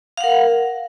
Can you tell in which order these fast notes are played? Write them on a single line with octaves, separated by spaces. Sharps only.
F5 F#5 A#4